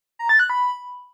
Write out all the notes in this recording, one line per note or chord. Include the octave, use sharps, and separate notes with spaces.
A#5
A6
F#6
B5